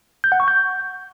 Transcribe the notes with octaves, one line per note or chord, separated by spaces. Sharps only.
G6
F#5
C#6
G6